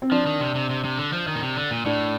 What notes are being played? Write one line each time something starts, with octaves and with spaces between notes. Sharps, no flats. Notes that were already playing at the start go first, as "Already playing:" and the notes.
C4
F3 D4
D#3
C3
C3
C3
C3
D3
F3
D#3
A#2
C3
D3
A#2
A2 D4